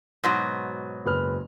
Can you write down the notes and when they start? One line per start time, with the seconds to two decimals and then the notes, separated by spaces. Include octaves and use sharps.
0.24 G#2 B2 F#3
1.05 F#1 B4 F6